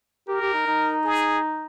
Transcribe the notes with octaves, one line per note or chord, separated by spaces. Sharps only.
G4 A#4
G4
D#4
D#4
G#4